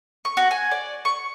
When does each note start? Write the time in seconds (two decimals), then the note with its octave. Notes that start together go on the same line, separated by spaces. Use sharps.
0.25 C#6
0.37 F#4
0.51 G#5
0.71 D5
1.05 C#6